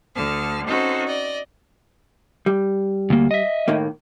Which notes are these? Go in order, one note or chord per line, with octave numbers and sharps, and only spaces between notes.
D2 D3 A5 F6
C4 C#4 D#4 F#4 A4 C5
D5 D#5
G3
D2 A#3
D#5 E5
A2 D#3 A#3